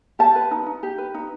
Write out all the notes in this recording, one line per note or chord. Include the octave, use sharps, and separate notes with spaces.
G4 A5
B4
D#4
D#4
G4
B4
D#4